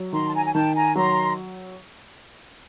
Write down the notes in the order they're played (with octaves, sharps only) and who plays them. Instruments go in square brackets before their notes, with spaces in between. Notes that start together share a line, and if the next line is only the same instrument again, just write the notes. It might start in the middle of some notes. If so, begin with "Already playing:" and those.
Already playing: [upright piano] F#3
[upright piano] D#3 [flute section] A#5 C6
[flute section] A5
G#5 A#5
G#5
[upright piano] D#3 [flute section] G5 A5
[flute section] G#5 A#5
[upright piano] F#3 [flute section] A#5 C6